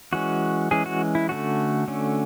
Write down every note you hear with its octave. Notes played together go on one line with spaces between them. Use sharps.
E3 G#3 C#4 F#4
E3 G#3 C#4 G#4
F#4
E4
D3 A3 C#4 F#4
D3 A3 C#4